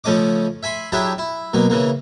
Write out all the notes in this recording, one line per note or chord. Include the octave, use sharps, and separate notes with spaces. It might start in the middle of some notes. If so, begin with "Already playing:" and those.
C#3 F3 A3 C#4 D#5 D6
E5 G#5 B5 C6
F#3 D4 E4 G4 G#4 E5
E4
B2 F#3 A#3
C#3 E3 A#3